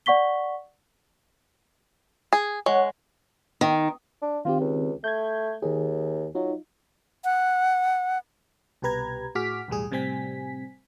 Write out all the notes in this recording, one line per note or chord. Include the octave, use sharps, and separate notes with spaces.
D5 F#5 C#6 B6 G7
G#4
G#3 C#5 F#5
D#3
D4
D#3 C4 F4 G4
C#2
A3 G6 G#6
D#2 D#3 G#4
F#3 D#4 F4
F#5
C2 B2 G4 B4 A#5 G#6
A2 F#4 G#4 D6 F6 B6
B1 E2 A2 G3 G#4
A2 C3 G3 C4 G#5 B6